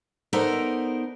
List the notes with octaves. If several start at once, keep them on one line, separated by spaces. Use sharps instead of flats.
B3 D#4 A4 A#4 C5 D5